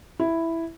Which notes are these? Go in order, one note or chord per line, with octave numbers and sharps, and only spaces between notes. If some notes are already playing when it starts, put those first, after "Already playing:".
E4